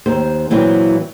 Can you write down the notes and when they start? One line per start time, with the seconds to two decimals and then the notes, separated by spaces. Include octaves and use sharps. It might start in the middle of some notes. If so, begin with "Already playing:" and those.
0.06 D#2 C5
0.50 A#2 E3 F#3 C4 E4